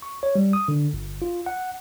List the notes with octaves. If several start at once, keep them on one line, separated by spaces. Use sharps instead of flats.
C#6
C#5
G3
D#6
D3
G1
F4
F#5